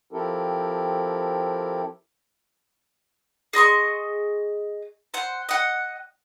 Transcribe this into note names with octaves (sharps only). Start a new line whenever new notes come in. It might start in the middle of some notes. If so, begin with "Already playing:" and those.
F3 C4 E4 G4 A4 A#4
G#4 D#5 C6 C#6
C5 F#5
D#5 F#5